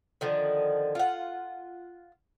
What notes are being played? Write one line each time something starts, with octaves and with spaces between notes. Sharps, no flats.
D3 D#3 F3
F4 F#5